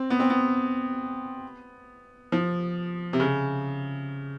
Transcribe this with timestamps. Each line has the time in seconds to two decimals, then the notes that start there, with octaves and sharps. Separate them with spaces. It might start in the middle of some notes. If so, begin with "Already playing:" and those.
Already playing: C4
0.10 B3
0.20 C4
0.30 B3
2.32 F3
3.13 C3
3.20 C#3